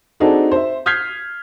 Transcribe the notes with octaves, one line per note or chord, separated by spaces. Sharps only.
C4 D4 D#4 F#4 G#4 A4
C5 E5
D#6 F6 G6 G#6 B6 C7